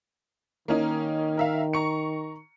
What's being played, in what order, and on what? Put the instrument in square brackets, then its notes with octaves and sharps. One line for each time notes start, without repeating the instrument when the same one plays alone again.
[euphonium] D#3 [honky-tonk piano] A#3 C#4 D#4
[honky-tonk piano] A#4 E5 F5
A#5 C#6 C#7